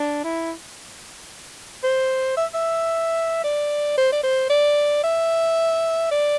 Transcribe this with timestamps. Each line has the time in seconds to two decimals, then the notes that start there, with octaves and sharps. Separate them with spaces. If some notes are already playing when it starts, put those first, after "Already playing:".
Already playing: D4
0.24 E4
1.84 C5
2.37 E5
2.54 E5
3.44 D5
3.98 C5
4.12 D5
4.24 C5
4.50 D5
5.04 E5
6.11 D5